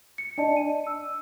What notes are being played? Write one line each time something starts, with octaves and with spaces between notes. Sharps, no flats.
C#7
D4 D5 D#5 A5
D#7
E6